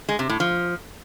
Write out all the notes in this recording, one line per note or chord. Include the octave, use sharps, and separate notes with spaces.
G#3
C3
A2
F3